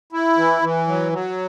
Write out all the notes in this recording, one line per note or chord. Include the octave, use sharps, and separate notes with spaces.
E4
E3
E3
F#3
F#3